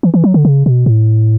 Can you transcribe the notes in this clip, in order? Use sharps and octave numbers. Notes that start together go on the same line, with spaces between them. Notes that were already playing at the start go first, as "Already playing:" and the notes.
E3
E3
F#3
D3
C#3
B2
A2